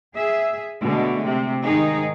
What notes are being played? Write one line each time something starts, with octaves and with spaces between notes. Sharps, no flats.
G#4 E5
B2 D3 G#3 A3
C3
G#2 D#3 D#4 G#4